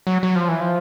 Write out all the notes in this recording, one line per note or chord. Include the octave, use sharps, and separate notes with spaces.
F#3
F#3
F3
E3
F3